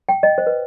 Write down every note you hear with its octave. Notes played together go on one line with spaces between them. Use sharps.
G5
D#5
C5
B4